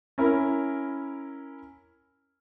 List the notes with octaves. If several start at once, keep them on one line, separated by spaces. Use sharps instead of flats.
C#4 E4 A#4 B5